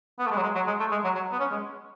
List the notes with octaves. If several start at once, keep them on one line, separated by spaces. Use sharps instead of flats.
B3
A3
G#3
F#3
G#3
F#3
G#3
A3
G#3
F#3
F#3
B3
C#4
G#3